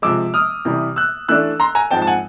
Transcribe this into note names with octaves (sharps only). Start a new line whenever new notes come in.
C3 F3 G#3 D6 E6
D#6 F6
C3 E3 G3
E6 F#6
E3 A3 D4 E6 F#6
A#5 C6
G#5 A#5
G#2 F3 G#3 C4 G5 A5
A5
F#5 G#5